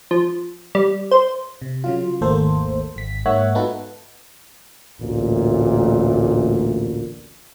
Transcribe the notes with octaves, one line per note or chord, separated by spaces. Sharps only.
F3
G3
C5
C3
C#3 F#3 F4
G#1 D#2 A3 A#3 A4 C5
G#1 B6
G#2 A#3 C#5 E5 F#5 F#6
B3 D#4 F4 F#4 A4 B4
A1 D2 A#2